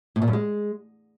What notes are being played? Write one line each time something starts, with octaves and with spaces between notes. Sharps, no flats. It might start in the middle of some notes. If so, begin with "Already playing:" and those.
A2
A#2
F#2
G#3